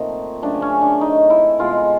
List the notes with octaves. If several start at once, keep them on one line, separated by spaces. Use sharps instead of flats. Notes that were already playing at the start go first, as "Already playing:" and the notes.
Already playing: A#2 F3 A3 C4 D#4
C#3 F#3 A3 C4 D4
C#4
D4
D#4
E4
B2 G#3 B3 F4